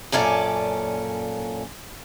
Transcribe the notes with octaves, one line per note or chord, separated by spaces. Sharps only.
F#2 A#2 C#4 A4 D5